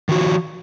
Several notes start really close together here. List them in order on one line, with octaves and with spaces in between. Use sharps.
D#3 F#4 F3